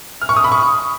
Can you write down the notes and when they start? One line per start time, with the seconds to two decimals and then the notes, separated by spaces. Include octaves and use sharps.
0.22 F6
0.29 C#6
0.37 D#6
0.44 B5
0.52 C#6